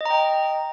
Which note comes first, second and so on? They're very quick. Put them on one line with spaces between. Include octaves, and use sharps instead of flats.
D#5 A#5 G5